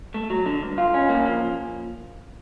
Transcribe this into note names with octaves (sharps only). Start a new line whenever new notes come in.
A3
F#3
D3
G2
F4
C#4
A#3
F3